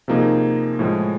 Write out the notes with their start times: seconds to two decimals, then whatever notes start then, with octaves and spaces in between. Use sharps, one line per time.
0.08 C3 F3 A#3 D#4 G#4
0.79 A2 F3 G#3